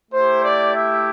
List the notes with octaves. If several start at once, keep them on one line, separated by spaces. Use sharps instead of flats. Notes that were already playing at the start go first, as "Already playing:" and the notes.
A3 E4 G4 C5
D5
E5